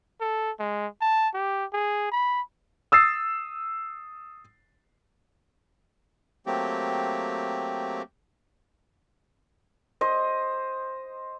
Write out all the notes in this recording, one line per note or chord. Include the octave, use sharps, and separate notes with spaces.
A4
G#3
A5
G4
G#4
B5
D#6 E6 A6 C7
F#3 A3 A#3 C4 G4
C5 D#5